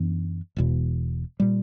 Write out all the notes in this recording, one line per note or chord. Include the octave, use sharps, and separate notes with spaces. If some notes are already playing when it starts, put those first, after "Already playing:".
Already playing: F#2 E3 B3 D4
E1 E2 B2
A#2 G3